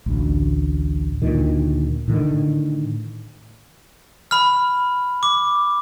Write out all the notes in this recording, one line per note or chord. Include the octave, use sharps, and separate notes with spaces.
A1 D2
D2 A#2 D#3
A2 D3 D#3
B5 F6
D6